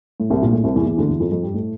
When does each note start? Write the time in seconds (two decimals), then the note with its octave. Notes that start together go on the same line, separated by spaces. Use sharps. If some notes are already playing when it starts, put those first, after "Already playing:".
0.20 A2
0.30 C2 C3
0.42 A#1 A#2
0.53 A2
0.64 C2 C3
0.76 E2 E3
0.86 E2 E3
0.98 D2 D3
1.08 E2 E3
1.20 F2 F3
1.31 F2 F3
1.43 G2 G3
1.54 A2 A3